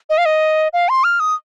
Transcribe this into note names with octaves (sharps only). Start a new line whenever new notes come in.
D#5
F5
D#5
F5
C6
F6
D#6